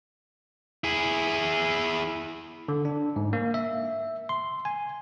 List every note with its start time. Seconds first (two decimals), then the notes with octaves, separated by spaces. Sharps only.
0.84 E4 G#4
2.68 D3
2.85 D4
3.16 G#2
3.33 A#3
3.54 E5
4.29 C6
4.65 G#5